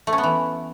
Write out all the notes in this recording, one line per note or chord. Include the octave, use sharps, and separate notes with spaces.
A3
C#4
B3
E3